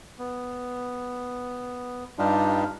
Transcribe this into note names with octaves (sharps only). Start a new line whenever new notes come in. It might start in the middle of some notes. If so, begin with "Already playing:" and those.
B3
G2 G3 D4 D#4 F4 G4